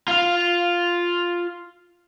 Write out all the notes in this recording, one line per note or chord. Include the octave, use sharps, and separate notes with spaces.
F4 F5